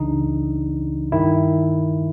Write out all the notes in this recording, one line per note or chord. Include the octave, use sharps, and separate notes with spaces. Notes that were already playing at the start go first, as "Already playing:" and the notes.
Already playing: C#2 C#3 E3 D4 D#4
G2 D#3 E4